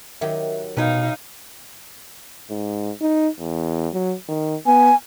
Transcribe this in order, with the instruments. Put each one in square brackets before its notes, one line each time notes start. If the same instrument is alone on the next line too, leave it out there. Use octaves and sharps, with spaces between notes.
[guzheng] D#3 F#3 G4 [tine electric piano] E5
[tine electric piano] B2 [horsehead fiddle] D#4 F5 [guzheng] B4 C#5 G5
[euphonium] G#2
D#4
E2
F#3
D#3
[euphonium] B3 [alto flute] G#5